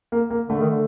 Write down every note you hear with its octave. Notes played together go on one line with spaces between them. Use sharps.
A#3
A#3
D3 A3
D#3
D3